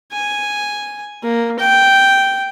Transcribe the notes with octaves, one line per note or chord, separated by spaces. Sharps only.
G#5
A#3
G5